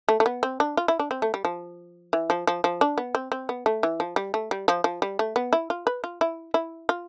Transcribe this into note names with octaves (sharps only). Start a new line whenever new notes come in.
A3
A3
B3
C4
D4
F4
E4
D4
C4
A3
G3
F3
E3
F3
F3
F3
D4
B3
C4
C4
B3
A3
E3
F3
G3
A3
G3
F3
F3
G3
A3
B3
E4
F4
B4
F4
E4
E4
F4